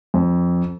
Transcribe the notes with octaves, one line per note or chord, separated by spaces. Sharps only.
F2